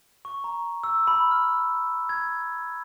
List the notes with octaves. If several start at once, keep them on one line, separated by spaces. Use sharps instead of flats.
C#6
A#5
E6
B5
F6
G#6